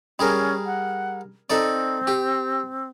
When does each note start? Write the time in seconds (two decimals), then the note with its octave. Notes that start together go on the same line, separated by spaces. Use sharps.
0.19 G3 C#4 G#4 A#4
0.66 F#5
1.50 C4 D#4 A4 D5
2.07 G4